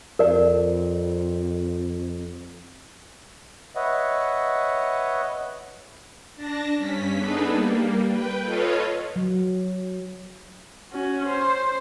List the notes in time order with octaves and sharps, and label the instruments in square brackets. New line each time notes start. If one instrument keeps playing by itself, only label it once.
[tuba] F2 [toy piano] A#4 D5
[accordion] B4 C#5 D#5 E5 F#5
[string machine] D4 A5 A#6
G2 C#4 B6
B3 D4 D#4 G#4 A4 B4
G3 A#3
B4 G5
F4 A4 B4 C#5 D#5 F5
[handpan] F#3
[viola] C#4 F#4
C5